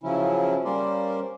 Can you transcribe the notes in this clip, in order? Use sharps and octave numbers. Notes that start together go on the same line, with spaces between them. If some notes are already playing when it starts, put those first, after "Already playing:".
C#3 F3 F#3 C#4 E4
G3 A#3 C#4 A#4 C5 D5